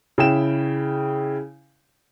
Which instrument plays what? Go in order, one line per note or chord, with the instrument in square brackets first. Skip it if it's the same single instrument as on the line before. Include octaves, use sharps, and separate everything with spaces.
[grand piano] C#3 E4 G5 E7